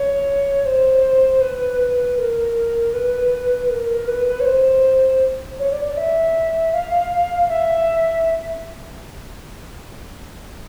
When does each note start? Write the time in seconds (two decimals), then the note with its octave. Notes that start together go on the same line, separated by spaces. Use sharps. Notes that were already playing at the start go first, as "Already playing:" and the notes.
Already playing: C#5
0.65 C5
1.41 B4
2.18 A#4
2.94 B4
3.70 A#4
4.08 B4
4.26 B4
4.40 C#5
4.45 C5
5.60 C#5
5.72 D5
5.84 D5
5.97 E5
6.73 F5
7.49 E5